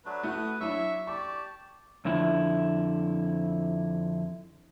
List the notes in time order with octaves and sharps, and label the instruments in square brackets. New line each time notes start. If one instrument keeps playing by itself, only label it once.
[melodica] F#3 A3 D4 [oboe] B4
[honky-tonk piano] A3 E4 F#4 [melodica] D#6
[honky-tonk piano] F#3 D4 E4 [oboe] E5 [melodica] C#6
[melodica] G4 A5 [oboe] D5 [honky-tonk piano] C#6
[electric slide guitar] F2 D3 E4